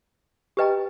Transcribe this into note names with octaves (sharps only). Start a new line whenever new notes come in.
G4 B4 D#5 G5 A#5